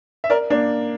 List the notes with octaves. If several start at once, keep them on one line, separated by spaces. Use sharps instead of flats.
E5
A#4 D5
A#3 D4